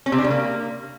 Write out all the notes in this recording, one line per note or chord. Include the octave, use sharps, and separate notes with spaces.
C#4
C3
D4
C#3
A#3